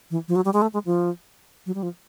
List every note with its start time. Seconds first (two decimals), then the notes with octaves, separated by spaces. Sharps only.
0.11 E3
0.28 F3
0.36 F#3
0.45 G3
0.53 G#3
0.62 A3
0.74 G#3
0.85 F3
1.66 F#3
1.75 G3
1.83 F3